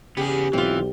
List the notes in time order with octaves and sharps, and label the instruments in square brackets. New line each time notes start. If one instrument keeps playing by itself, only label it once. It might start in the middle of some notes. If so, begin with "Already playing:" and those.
[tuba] C#3 [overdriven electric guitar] B3 G#4 [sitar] G4
[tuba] B1 [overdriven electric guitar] E3 [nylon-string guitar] C4 F4